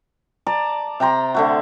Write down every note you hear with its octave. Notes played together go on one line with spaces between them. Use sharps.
D5 A5 A#5
C3 G5 A#5 C6
D3 A3 F#4